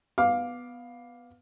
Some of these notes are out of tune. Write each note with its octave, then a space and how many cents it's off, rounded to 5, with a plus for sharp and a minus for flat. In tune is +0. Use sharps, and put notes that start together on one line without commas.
B3 +0 F5 +10 D6 +0